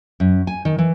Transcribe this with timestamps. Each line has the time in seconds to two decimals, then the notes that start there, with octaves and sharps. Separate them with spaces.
0.20 F#2
0.47 G#5
0.65 D#3
0.78 E3